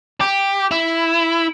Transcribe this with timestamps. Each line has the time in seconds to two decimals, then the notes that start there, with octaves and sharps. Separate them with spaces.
0.20 G4
0.71 E4